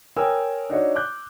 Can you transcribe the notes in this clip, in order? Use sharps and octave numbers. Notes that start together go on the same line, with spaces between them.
A#4 C#5 G5 G#5 D#6 E6
D4 D#4 F#4 C#5
D6 F#6 G6